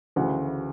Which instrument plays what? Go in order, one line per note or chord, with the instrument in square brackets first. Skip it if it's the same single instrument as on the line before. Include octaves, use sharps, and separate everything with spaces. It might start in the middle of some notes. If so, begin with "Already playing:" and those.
[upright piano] D2 C#3 E3 F#4 F#5